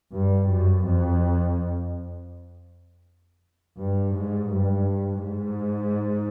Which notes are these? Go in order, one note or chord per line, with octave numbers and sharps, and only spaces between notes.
G2
F#2
F2
G2
G#2
G2
G#2